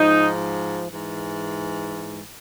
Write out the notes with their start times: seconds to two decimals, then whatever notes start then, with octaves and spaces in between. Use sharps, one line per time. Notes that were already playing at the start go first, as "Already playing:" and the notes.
Already playing: G#2 F3 D#4
0.92 G#2 E3